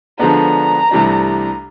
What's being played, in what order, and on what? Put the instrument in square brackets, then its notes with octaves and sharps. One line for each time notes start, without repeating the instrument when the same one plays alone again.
[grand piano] D3 F3 G#3 B3 D4 [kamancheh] A#5
[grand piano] C2 C3 E3 A3 D4